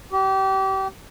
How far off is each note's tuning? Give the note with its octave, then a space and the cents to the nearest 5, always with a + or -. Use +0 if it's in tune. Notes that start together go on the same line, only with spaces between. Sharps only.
G4 -30